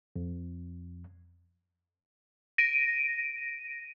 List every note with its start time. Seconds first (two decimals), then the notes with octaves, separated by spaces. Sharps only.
0.16 F2
2.58 A#6 D7 D#7